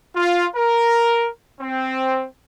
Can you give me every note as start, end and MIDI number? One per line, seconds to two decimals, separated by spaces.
0.16 0.47 65
0.55 1.27 70
1.61 2.27 60